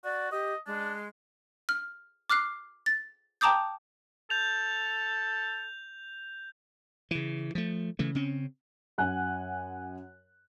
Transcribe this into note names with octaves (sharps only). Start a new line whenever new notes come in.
F#4 D5
G4 D#5
G#3 D4
F6
D6 F6 F#6 C7
A6
G5 A5 A#5 D6 D#6 G6
A4 G6 F7
C#3 E3
F3 A3
C#3 E3 A3
C#3 C4 C#4
F#2 F#5 G#5 F#6